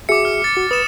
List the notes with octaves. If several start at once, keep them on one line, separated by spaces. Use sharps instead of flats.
F#4 G#4 E5 D6 C#7
F6
F6 A6
F#4
B4 D#6 E7